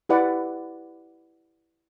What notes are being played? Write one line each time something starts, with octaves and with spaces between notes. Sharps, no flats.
E4 G4 B4 D5 F#5